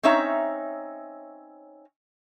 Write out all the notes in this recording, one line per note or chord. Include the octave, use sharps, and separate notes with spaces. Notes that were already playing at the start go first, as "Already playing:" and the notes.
C4 C#4 D#4 C#5 E5 A#5